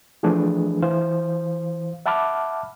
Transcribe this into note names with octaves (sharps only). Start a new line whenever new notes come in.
E3 F3 A3 D4 G#4 B4
E3 C5 F5
E5 F#5 A5 B5 D6 F6